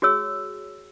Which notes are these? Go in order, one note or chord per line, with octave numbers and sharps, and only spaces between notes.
F#4 G#4 C#5 E6